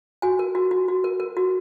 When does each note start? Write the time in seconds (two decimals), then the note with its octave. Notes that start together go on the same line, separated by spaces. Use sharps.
0.22 F#4 G#5
0.39 A#4
0.55 F#4
0.71 F#4
0.88 F#4
1.04 A#4
1.20 A#4
1.37 F#4